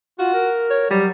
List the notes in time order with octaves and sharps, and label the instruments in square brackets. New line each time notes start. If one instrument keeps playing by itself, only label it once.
[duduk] F4 [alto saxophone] F#4
[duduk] A#4
[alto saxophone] C#5
[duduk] F#3 [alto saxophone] G3